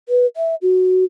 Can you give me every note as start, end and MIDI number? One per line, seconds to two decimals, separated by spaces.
0.09 0.26 71
0.37 0.55 76
0.62 1.04 66